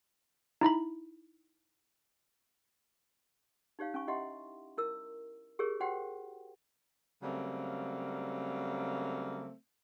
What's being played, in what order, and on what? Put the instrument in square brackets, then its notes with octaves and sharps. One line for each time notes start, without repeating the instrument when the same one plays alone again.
[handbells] D#4 E4 A#5 B5
[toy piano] D#4 G4 C#5 F5
C#4 G#5 C#6
E4 G4 D#5 E5 F#5 C6
E4 A#4 E6
G4 G#4 A#4 C#5
F#4 G4 C5 F#5 G5
[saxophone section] C#3 F#3 G3 A3 A#3 C4